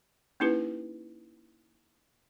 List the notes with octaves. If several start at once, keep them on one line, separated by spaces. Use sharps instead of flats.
A#3 C#4 D#4 E4 G4 B4